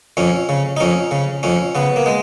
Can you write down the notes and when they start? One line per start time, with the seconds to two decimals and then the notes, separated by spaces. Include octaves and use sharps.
0.17 F2 C#4
0.49 C#3
0.77 D#4
0.80 F2 C#4
1.11 C#3
1.43 F2 C#4
1.75 C#3 B3
1.96 A#3
2.06 G#3